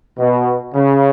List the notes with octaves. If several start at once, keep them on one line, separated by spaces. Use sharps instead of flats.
B2
C#3